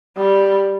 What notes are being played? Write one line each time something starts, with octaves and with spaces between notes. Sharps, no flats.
G3